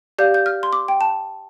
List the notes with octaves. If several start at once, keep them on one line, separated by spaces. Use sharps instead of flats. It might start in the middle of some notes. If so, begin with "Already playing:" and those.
G4 D5 F5 G6
G6
F6
C6
D6
G5
A5